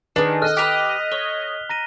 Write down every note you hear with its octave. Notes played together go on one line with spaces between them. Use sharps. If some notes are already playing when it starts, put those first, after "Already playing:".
D#3 D4 G#4 B4
A4 D#5 F6 F#6
G4 A#4 B4 F#6 B6 F7
C#5 G7
A#5 A#6 D#7